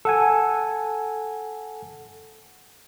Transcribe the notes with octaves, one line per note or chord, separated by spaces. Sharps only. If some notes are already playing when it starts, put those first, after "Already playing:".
A4 F#5 G#5